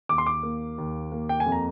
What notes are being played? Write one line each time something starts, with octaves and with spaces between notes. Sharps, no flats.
D#2 D6
C6
D6
A#3
D#2
A#3
G5
G#5
F2
A#5